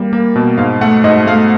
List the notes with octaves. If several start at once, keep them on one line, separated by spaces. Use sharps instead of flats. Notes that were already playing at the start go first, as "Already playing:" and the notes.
Already playing: G3 A#3
A#3
B2
G#2 F5
A3 F#5
G#2 D#5
A3 F5